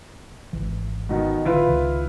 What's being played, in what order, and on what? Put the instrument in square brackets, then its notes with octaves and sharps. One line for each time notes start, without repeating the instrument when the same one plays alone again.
[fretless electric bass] G#1 E3
[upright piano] B2 D#3
[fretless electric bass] A1 D3 D#3 [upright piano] E4 F4 B4
[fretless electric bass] C#2 C3 D#3